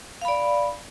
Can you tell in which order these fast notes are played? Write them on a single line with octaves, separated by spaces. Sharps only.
F5 B5 D5